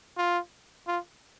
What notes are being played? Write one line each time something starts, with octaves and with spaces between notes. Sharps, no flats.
F4
F4